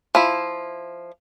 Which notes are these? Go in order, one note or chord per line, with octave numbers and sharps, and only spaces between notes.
F3 E4